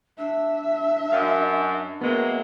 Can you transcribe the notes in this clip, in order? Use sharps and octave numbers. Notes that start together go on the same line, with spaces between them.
D4 E5
F#2 D#5 F5
A2 F#3 G#3 A#3 B3